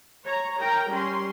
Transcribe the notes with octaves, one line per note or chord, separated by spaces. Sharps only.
C#5 A#5
A#4 G5 A#5
G3 C#4 C6